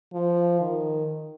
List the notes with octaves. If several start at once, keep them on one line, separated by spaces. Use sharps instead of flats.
F3
D#3